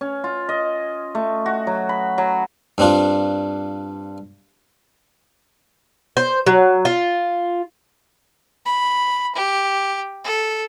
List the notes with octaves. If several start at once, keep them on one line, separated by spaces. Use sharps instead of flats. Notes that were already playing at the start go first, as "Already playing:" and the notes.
C#4
F4
D#5
A3
F#4
F#3
B5
F#3
G2 C4 D4 F4
C5
F#3
F4
B5
G4
A4